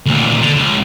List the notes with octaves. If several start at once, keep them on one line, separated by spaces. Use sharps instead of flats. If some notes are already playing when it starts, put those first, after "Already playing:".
D2 A#2
D3
C#2